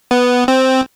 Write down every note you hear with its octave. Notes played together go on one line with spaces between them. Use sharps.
B3
C4